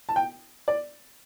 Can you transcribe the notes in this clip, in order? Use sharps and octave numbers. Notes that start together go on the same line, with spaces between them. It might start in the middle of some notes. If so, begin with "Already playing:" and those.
A5
G5
D5